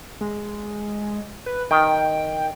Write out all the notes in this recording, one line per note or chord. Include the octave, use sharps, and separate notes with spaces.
G#3
B4
D#3 G5